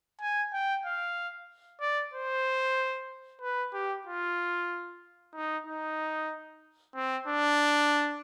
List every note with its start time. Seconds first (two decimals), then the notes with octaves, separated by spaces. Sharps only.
0.21 G#5
0.53 G5
0.85 F5
1.81 D5
2.14 C5
3.42 B4
3.73 G4
4.07 F4
5.35 D#4
5.67 D#4
6.95 C4
7.28 D4